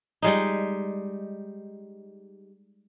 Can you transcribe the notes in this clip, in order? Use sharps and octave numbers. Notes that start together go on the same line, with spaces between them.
G3 G#3 D#4